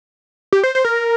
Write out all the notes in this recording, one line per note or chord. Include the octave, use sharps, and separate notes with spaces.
G4
C5
C5
A#4